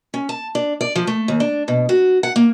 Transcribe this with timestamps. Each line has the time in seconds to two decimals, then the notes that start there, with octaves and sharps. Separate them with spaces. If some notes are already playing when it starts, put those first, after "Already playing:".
0.14 C#4
0.29 A5
0.55 D4
0.81 D5
0.96 F3
1.07 A3
1.28 D#2
1.40 D4
1.68 B2
1.89 F#4
2.23 F#5
2.36 A#3